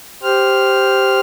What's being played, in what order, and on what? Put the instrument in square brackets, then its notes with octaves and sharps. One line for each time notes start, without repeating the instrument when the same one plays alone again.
[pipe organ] G4 C5 F6